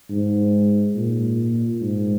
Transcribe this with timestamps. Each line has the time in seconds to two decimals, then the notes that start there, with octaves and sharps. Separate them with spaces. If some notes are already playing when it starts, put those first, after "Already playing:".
0.10 G#2
0.96 A#2
1.81 G#2